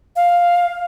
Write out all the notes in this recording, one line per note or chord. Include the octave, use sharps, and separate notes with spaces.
F5